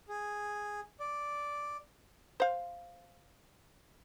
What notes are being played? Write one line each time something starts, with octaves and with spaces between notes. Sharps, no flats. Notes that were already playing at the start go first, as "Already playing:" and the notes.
G#4
D5
C5 F5